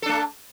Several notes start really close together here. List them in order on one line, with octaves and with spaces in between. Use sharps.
A4 D4 A3